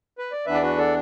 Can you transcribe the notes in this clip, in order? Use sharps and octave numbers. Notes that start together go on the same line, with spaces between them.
B4
D5
E2 E3 B3 D4 B4 E5
D5
F#4 B4
A4 D5